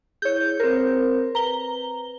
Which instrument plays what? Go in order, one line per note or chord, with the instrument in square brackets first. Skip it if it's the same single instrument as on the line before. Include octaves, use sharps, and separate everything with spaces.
[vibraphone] E4 G#4 [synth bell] C#5 G6
[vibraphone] C4 C5 [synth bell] A#4
[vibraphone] B4 [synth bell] A#5 G7